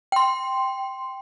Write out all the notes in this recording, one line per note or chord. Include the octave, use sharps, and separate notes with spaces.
G5 C6